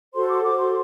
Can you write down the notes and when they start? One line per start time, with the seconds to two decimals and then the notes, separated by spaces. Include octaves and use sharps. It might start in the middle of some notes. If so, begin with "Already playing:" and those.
0.14 F#4 A4 C5 C6
0.29 D6
0.43 F#4 A4 C5 D6
0.58 C6